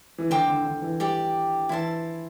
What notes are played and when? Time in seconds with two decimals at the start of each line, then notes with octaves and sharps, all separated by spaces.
0.18 E3
0.30 D3 C5 G5 D6
0.48 D3
0.65 D3
0.82 E3
1.00 G3 G4 D5 G5
1.69 E3 E4 C5 A5